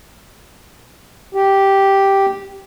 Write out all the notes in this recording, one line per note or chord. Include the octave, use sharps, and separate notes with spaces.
G4